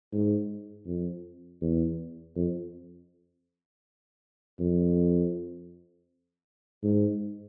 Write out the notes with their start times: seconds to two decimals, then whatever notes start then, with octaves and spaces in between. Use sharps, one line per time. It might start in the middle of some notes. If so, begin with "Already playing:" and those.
0.13 G#2
0.87 F2
1.61 E2
2.36 F2
4.60 F2
6.83 G#2